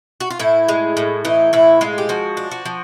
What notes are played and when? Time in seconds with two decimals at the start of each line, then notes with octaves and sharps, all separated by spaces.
0.20 F#4
0.30 F4
0.39 A2 E4
0.68 G#3
0.97 A2
1.25 E3 D#4
1.53 A2 E4
1.81 G#3 F4
1.98 G4
2.09 F3 F#4
2.37 D4
2.51 F#4
2.65 F3